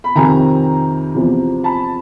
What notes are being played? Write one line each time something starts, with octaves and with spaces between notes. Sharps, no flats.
B5
F2 C3 D#3 G#5 A#5
E2 C3 F3
A5 B5